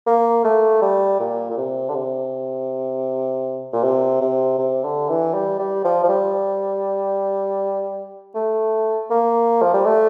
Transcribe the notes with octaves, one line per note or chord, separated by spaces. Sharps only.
A#3
A3
G3
A#2
A#2
C3
D3
C3
A#2
C3
C3
C3
D3
E3
G3
G3
F3
F3
G3
A3
A#3
F3
G3
A3